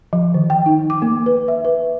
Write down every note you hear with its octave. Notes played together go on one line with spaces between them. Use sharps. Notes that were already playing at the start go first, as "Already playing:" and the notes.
F3
D#3
G5
D#4
D6
A#3
B4
E5
B4